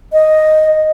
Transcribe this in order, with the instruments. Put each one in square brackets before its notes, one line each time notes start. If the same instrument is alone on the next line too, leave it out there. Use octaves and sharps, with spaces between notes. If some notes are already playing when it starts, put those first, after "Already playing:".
[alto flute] D#5